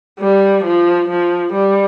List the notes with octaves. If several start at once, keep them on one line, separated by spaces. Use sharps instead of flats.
G3
F3
F3
G3